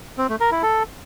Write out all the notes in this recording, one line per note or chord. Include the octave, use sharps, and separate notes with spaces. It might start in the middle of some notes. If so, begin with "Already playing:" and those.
C4
A3
A#4
E4
A4